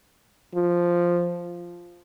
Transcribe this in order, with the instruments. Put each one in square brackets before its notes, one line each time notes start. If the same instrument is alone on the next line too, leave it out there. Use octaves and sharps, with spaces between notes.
[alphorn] F3